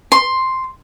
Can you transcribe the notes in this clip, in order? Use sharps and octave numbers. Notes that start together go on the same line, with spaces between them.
C6